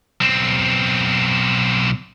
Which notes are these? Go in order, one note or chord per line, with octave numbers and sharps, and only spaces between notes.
B1 C4